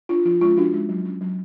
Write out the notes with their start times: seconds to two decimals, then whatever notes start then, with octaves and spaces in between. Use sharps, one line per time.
0.09 D4 F4
0.25 F3 F4
0.41 G#3 C#4 F4
0.57 F3 D4 F#4
0.73 G#3 C#4
0.89 F#3
1.05 C#4
1.21 F#3